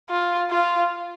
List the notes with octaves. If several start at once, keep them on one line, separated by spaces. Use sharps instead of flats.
F4
F4